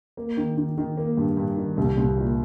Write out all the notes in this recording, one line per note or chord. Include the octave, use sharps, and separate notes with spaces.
A#3
D#3
D#3
D#3
A#3
G2
G2
D#3
C2
C2
A#2